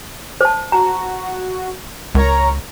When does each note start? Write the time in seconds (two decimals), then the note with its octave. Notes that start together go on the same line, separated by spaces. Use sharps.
0.41 C5 A5
0.72 F#4 A#5
2.15 C#2 A#4 C#5 A#5